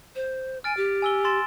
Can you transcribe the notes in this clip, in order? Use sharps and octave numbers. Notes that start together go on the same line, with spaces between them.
C5
G#5 F6 A6 D7
G4
G#5 E6 G7
C6 A6 E7